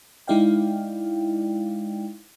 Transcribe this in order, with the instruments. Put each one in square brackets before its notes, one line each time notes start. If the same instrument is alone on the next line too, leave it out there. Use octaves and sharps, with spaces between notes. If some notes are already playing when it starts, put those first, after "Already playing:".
[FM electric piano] G#3 D#4 E4 D5 F5 G5